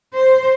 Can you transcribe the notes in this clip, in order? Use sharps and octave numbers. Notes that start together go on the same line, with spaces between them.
C5